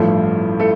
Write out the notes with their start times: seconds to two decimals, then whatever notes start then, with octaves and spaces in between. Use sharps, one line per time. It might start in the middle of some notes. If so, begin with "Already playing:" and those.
Already playing: A1 G2 F3 A3
0.60 A3 A4